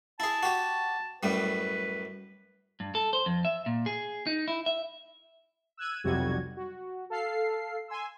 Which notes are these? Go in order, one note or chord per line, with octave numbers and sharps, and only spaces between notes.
E4 G#4 A5
F#4 G4
F#2 A2 G3 B4
G2
A4
C5
F2
E5
A#2
G#4
D#4
E4
E5
E6 F#6 G#6 D#7
B1 F2 C3 G3 F#4 G#6
F#4
A4 F5 C7
G#5 C6 E6